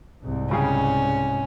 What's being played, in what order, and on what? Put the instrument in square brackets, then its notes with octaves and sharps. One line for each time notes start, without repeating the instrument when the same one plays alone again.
[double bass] C2 G#2
[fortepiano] C#3 G3 G#4 [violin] C#4